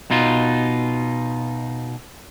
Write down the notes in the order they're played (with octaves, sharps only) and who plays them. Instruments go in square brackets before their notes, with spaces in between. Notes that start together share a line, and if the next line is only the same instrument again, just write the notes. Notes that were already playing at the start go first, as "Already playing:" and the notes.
[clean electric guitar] B2 D#4 F4